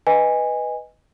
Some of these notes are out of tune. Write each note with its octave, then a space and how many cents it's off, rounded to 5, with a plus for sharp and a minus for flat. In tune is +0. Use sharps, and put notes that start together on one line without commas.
B4 +0 D#5 +0 G#5 -15